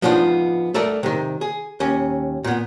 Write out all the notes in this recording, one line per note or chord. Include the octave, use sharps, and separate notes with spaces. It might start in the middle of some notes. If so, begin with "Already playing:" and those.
F3 B3 D4 D#4 F4
A3 A4 A#4 D5
C3 D#3
G#4
D#2 C#4
A#2 B3